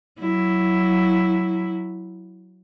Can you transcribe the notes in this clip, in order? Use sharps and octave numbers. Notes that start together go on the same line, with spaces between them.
F#3 E4